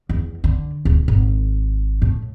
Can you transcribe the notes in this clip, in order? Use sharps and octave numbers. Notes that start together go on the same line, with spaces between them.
E2
D3
D1
G#1
A2